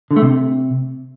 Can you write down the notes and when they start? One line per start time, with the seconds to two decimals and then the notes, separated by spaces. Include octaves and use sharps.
0.11 D3
0.16 A3
0.22 C3